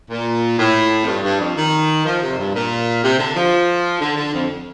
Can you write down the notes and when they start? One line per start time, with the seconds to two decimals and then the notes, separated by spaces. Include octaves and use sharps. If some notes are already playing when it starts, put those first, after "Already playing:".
0.09 A#2
0.58 A2
1.01 F2
1.06 G2
1.22 G2
1.39 F2
1.55 D#3
2.04 F3
2.20 C3
2.29 F2
2.37 G2
2.53 A#2
3.02 C3
3.18 D3
3.35 F3
4.00 D3
4.16 D3
4.33 F2